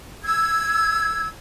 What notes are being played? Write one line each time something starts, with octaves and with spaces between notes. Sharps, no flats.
E6 G#6